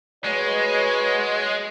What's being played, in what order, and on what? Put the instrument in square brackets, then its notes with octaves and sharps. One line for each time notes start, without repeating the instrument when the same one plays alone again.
[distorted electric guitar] G#3 [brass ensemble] F#4 B4 C#5